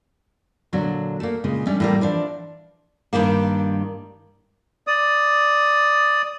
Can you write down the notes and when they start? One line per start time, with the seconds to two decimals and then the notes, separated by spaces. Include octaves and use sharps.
0.73 A#2 D3 F#3 D4
1.20 A3 A#3
1.44 A#2 C#3 G#3
1.67 G3 A3 C#4 D4
1.80 A2 G3 A#3
2.01 E3 F3 D4
3.13 G2 D#3 G3 A#3
4.87 D5 D#6